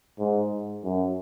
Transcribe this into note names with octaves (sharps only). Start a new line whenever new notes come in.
G#2
F#2